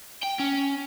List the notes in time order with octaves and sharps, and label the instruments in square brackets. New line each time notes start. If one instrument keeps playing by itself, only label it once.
[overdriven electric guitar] G5
C#4